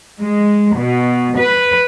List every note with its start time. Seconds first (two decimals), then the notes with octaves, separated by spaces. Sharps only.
0.20 G#3
0.76 B2
1.37 B4